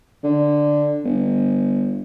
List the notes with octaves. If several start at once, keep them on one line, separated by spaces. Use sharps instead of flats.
D3
G1